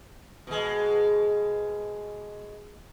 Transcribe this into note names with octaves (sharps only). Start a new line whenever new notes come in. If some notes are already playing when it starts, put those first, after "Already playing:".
B2 G#3